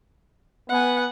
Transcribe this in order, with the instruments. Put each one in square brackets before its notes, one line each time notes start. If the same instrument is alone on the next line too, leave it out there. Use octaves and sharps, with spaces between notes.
[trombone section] B3 [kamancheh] F#5 G#5